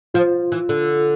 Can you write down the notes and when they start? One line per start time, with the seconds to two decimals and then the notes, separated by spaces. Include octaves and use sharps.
0.14 F3 F4
0.52 E3
0.69 D3